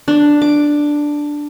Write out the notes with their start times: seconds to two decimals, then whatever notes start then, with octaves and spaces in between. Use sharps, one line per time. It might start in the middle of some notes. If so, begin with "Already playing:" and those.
0.08 D4
0.42 D6